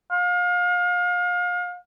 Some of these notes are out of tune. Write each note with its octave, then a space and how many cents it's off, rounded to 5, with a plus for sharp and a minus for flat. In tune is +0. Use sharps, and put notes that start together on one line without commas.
F5 +35